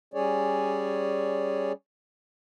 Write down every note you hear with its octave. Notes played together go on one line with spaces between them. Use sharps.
G3 C#4 G#4 C#5 D5